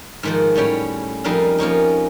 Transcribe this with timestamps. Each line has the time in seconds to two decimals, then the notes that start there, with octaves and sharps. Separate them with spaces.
0.23 G#2 D#3 F3
0.56 A2 G3 C#4 G5
1.24 F2 G3 D#4 A#4 F5
1.58 F3 A#3 C#4 D#4